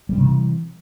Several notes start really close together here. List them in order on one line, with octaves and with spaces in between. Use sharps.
G3 C4 C3 E3